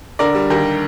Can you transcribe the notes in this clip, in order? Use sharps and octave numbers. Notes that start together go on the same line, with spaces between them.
D3 A#4 D5
G3
D#2 G4 A#4